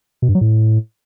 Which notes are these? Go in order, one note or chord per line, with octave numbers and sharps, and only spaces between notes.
B2
G2
F#3
A2